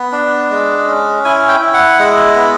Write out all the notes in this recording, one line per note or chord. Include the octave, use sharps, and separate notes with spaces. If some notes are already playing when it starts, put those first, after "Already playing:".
Already playing: B3
D4
G#3
C#4
E4 G#5
G5
E4
F#5
G#3
B3